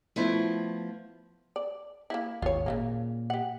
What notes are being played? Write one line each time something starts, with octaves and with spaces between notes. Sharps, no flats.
F3 A3 B3 E4
D5
A#3 B3 E4
G#1 D#2 F4 C#5
A#2 C#3 A3 A#3
G4 F#5